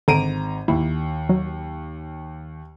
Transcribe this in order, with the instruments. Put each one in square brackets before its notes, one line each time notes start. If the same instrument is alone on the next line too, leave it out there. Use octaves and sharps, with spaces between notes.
[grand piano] G#1 A#5 D#7 [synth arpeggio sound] D3 D7
[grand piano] D#2 [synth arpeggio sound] E4
[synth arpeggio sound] F#3